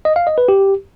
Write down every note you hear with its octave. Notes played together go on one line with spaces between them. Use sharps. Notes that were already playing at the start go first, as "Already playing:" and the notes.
D#5
F5
D#5
B4
G4